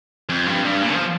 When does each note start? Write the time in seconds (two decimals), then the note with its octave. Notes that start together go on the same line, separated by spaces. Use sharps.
0.29 F2
0.46 G2
0.64 G2
0.81 A#2
0.94 F3